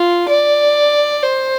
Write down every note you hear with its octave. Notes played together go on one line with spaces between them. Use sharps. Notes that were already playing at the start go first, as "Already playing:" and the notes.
Already playing: F4
D5
C5